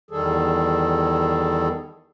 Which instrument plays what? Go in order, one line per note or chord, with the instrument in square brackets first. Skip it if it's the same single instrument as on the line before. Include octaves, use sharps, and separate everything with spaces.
[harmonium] E2 D#3 G3 G#4 A4